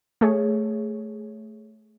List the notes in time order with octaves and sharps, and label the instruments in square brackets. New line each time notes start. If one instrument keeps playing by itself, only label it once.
[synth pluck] A3 G#4 C#5